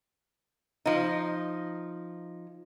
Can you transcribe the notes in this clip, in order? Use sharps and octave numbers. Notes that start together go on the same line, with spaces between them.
F3 D#4